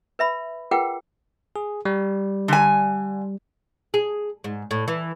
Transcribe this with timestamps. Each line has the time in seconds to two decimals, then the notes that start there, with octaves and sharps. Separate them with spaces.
0.19 B4 E5 B5
0.71 F4 G#4 A#4 B4 F#5 G5
1.56 G#4
1.85 G3
2.48 D3 G#5
3.94 G#4
4.44 G#2
4.71 A2
4.88 E3